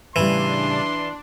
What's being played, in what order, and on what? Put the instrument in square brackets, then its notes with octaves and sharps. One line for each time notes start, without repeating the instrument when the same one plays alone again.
[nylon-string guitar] A2 C#3 G3 [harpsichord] E3 [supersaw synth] D4 [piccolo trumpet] C6